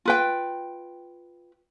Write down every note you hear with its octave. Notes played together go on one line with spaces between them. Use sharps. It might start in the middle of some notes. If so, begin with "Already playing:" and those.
F4 B4 G5